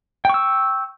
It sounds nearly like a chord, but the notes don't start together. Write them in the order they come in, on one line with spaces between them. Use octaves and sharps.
G5 C#6 E6